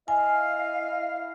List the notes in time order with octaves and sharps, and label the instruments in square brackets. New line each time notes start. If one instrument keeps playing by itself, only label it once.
[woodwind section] E4 D#5 F5 [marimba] G#5